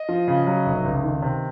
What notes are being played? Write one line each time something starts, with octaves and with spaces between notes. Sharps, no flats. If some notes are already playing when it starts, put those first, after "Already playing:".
Already playing: D#5
F3
C#3
F#3
F1
C#2
D#3
C3